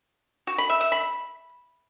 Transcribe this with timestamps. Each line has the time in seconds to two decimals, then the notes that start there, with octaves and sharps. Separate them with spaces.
0.47 F#4
0.58 B5
0.70 E5
0.81 E5
0.92 B5